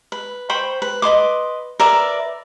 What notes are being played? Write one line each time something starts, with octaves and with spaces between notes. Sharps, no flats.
B4
C5 G5 B5 C#6
B4
B4 D#5 C6 D6
A#4 B4 D5 E5